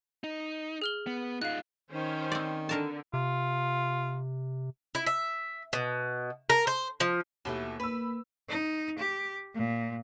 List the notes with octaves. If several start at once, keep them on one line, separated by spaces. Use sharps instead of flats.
D#4
G#4 F6 G7
B3
D#4 F4 F5 F#6
D#3 C#4 C5
C4 D5
D3 D4 A#4 A5
C3 F4
E4
E5
B2
A#4
C5
F3
D#2 B2 E3 A3
A#3 B4 B5 E6
D#4
G4
A#2